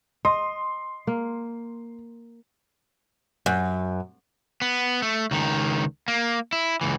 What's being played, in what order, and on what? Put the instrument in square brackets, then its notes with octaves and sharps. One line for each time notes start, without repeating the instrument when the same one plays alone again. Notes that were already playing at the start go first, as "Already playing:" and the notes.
[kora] D#5 [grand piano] C6
[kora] A#3
[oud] F#2
[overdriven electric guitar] B3
A3
C#2 D#3
A#3
E4
C#2 E3